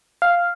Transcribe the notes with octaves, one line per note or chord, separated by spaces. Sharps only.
F5